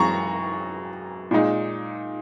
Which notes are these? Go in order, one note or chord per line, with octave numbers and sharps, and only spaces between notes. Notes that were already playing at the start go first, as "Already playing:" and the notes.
Already playing: F#2 E3 G#3 A#5 C#6
A#2 G#3 D#4